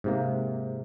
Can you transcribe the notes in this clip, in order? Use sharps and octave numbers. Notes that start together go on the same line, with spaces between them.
G#2 C3 A#3